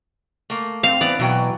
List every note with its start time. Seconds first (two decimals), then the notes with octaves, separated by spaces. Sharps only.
0.50 A3 A#3
0.83 C4 F5
1.01 E3 B3 D5
1.19 B2 E3 F#3 G5